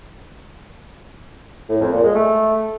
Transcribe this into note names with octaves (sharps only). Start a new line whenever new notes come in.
A2
F2
A#2
G#3
A3